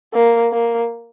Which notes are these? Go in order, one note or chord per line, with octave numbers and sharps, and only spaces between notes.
A#3
A#3